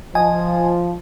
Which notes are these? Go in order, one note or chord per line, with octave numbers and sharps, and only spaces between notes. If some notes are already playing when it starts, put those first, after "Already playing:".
F3 D#5 G#5